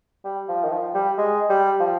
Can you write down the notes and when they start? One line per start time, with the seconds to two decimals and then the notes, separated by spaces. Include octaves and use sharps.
0.24 G3
0.49 F3
0.64 D#3
0.72 F3
0.94 G3
1.18 G#3
1.49 G3
1.80 F3